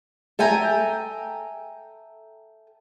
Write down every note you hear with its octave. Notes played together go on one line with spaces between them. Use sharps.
A4 E5 G5 G#5 A#5